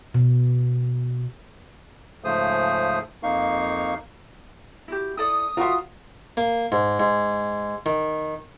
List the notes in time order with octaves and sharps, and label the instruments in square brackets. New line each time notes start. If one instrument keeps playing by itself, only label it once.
[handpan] B2
[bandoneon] G#2 C#3 F3 A3 C5 D#6
F2 A#3 D#4 F5 C#6
[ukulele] E4 F#4 G4
[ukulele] E4 A4 D5 [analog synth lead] D#6
[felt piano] F4 F#4 C6 [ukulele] A#4 E5
[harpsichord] A#3
G#2
G#2
D#3